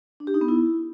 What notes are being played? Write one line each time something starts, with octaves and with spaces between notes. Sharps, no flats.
D4
G4
D#4
B3
E4